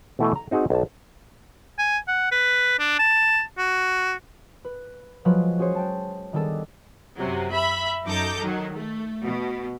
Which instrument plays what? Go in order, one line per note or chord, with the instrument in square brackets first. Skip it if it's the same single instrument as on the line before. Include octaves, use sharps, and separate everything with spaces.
[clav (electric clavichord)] B2 E3 A3 E4 A4
A#5
C4 D#4 F#4 G#4 F#5
B1 A5
[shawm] G#5
F#5
B4
D4
A5
F#4
[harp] B4
F3 F#3 G#3 B4
C#4 F#4 G#4 C5 C#5
G5 A5
D#3 G3 B3 D4 G#4 A4
[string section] F#2 C3 F#3
E5 B5
F#2 D#4 A4 A#5 D6 G6
D#3 F#3
A3
B2